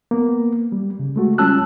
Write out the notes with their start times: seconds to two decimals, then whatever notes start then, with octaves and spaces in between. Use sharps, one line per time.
0.11 A#3 B3
0.72 G3
1.00 C#3
1.16 G#3 A3 F#4
1.38 G3 C#4 F4 A5 E6 F#6